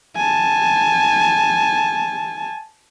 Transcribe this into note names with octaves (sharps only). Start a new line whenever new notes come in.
G#5 A5